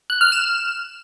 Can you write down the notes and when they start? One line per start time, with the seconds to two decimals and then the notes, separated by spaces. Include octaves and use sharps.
0.10 F#6
0.21 F6
0.32 E7